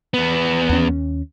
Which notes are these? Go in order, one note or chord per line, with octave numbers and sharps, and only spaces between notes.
E2 B3
D#2 C#4